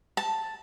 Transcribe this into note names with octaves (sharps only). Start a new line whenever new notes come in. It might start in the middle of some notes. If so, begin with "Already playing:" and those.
A5